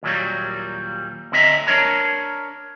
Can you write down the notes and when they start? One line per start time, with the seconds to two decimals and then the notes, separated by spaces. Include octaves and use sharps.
0.03 D#2 A#2 F#3 G3
1.32 D2 D3 C4 D#5 E5 A#5
1.67 D4 A#4 C#5 A#5